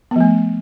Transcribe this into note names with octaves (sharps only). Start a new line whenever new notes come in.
F3 A3 B3